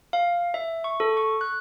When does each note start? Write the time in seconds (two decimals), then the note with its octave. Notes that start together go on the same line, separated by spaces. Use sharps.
0.13 F5
0.54 E5
0.84 C#6
1.00 A4
1.17 C#6
1.41 F#6